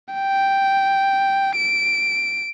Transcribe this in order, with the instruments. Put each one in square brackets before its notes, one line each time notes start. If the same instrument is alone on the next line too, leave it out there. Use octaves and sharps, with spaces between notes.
[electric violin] G5
D7